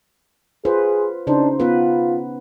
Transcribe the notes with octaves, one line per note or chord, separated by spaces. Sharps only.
F4 G#4 B4 C5
C#3 D4 D#4 C5
B3 F4 B4